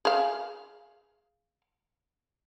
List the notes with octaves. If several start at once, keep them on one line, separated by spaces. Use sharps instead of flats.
G#4 F5